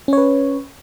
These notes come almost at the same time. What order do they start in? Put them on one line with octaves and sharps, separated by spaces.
C#4 C#5 B4